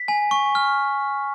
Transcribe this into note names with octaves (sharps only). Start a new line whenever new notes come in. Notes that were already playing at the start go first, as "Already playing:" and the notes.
Already playing: B6
G#5
C#6
F6